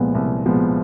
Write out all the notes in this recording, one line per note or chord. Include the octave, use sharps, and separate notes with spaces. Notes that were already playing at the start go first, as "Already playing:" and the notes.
Already playing: C2 A#2 F3 G#3 B3
C2
A#2 F3 G#3 B3